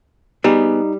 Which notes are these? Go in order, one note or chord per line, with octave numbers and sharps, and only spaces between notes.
G3 B3 D#4 G#4